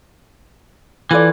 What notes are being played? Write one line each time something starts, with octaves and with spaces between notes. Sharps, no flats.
E3 F4 A4 D5